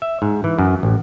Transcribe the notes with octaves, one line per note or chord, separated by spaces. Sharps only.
E5
G#2
E3
F#2
A1